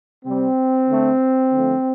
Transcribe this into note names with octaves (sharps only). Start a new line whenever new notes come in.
C3 G3 C4
D3 A3
D3 F3 A3